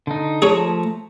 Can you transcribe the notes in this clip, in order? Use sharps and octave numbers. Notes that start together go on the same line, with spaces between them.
D3 D#4
F3 A3 C#4 G#4 A#5